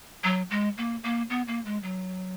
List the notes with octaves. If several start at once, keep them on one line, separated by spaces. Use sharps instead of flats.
F#3
G#3
A#3
A#3
B3
A#3
G#3
F#3